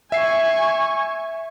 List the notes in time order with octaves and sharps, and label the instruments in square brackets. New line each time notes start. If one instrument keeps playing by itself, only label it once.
[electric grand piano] E5 C7 [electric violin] G#5 C#6